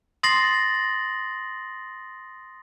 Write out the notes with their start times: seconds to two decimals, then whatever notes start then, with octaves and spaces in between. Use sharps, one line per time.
0.23 C6 D#6 A6 A#6 C7 F#7